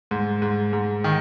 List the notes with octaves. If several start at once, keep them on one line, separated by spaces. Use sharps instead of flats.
G#2
G#2
G#2
D#3